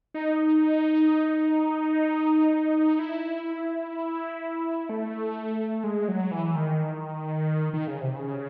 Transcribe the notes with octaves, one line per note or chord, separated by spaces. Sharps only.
D#4
E4
A3
G#3
F#3
E3
D#3
D#3
C#3
C3
C#3